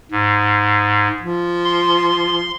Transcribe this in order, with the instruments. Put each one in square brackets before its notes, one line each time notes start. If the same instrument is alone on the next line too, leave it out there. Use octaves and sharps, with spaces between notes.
[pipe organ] G#2
[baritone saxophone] F3
[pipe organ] C6